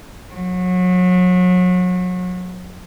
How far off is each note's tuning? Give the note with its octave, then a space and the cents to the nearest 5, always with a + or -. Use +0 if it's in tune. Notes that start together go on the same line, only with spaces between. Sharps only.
F#3 -30